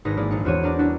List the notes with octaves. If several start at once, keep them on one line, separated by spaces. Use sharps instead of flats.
G#1 D#4 G#4 B4 A#6
G#3 A#3 E4 G#4 D5
A#1 D#4 C#7
E2 C4 F#4 G#4 C#5 D#7
C4 D4 A#4 D5
G3 C#4 D4 E4 F#4